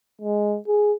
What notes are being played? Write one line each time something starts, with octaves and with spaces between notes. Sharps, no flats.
G#3
G#4